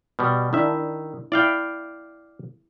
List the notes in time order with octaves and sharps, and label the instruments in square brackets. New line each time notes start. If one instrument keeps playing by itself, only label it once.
[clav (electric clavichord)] B2 G3
[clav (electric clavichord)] D#3 E5 [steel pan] D4 E4
[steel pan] E4 [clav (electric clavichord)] D5 F5 G5